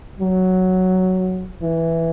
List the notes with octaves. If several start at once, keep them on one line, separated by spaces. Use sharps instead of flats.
F#3
E3